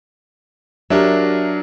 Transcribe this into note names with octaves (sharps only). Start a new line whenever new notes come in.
F#3 D4 G4 A#4 E5